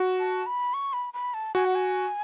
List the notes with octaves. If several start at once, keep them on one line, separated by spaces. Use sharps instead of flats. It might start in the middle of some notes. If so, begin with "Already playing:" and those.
Already playing: F#4
A5
B5
C#6
B5
B5
A5
F#4 G#5
F#5
G#5